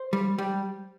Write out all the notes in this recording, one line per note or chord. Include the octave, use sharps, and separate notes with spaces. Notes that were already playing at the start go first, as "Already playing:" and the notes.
Already playing: C5
G3
G3